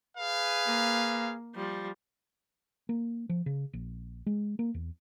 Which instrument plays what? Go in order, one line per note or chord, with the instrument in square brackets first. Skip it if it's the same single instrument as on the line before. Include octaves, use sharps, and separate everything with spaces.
[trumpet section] G#4 B4 F5
[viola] A#3
F3 G3
[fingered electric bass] A#3
F3
C#3
A#1
G#3
A#3
E2